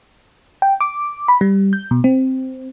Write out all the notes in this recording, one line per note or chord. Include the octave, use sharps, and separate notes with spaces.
G5
D6
B5
G3
G6
B2
C4